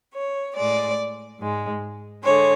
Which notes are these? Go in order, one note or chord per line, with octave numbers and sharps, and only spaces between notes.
C#5
A2 G#3 D5
G#2 G#3
D3 G#3 C#5